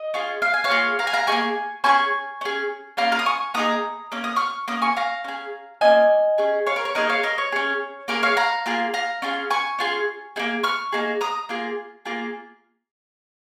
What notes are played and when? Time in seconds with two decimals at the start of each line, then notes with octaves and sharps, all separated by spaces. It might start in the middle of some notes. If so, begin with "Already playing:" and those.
Already playing: D#5
0.14 C#4 F4 G#4
0.42 F5
0.54 G#5
0.64 C#5 F5
0.70 A#3 F4 G#4
0.99 F5 A#5
1.07 G#5
1.13 F5 A#5
1.27 D#4 G#4 G#5 C#6
1.32 A#3
1.84 C#4 F4 G#5 C#6
1.89 G#4
2.41 C#4 G#4
2.97 A#3 C#4 F4 F5 A#5
3.12 F5 A#5
3.19 D#6
3.26 G#5 C#6
3.54 A#3 D#4 G#4 A#5 D#6
4.12 A#3 C#4
4.24 D#6
4.36 C#6 F6
4.68 A#3 C#4 D#6
4.82 G#5 C#6
4.96 F5 A#5
5.24 C#4 G#4
5.81 A#3 C#4 F4 D#5 G#5
6.38 C#4 G#4
6.66 C#5 F5
6.76 A#4
6.85 C#5
6.95 A#3 D#4 G#4 A#4 D#5
7.09 C#5 F5
7.23 A#4 D#5
7.38 C#5
7.52 C#4 G#4
8.08 A#3 C#4 G#4 A#4
8.23 C#5 F5
8.37 F5 A#5
8.66 A#3 F4 G#4
8.94 F5 A#5
9.22 C#4 F4 G#4
9.50 G#5 C#6
9.79 C#4 F4 G#4
10.36 A#3 D#4 G#4
10.63 C#6 F6
10.92 A#3 D#4 G#4
11.21 A#5 D#6
11.49 A#3 F4 G#4
12.05 A#3 F4 G#4